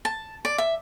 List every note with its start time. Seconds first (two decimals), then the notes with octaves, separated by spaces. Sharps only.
0.05 A5
0.45 D5
0.58 E5